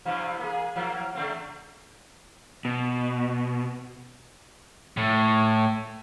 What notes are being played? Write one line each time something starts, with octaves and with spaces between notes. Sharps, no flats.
G2 C3 E3
A#3 G#4
E3 F#3 A#3
C#3 A3 C4
B2
A2